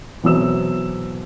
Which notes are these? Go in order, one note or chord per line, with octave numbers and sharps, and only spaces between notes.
B2 E3 F#3 C4 E6 E7